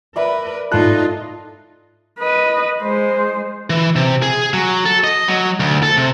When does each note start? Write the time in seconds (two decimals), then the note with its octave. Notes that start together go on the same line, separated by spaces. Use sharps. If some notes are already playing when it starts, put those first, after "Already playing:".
0.16 A#4 B4 D5 E5 B5
0.72 G#2 D#4 F4 A4 C6 F#6
2.19 B4 D#5
2.82 G#3 C5
3.70 E3
3.96 C3
4.22 G#4
4.54 F#3
4.86 A4
5.04 D#5
5.28 F#3
5.60 D2
5.83 A4
5.97 C3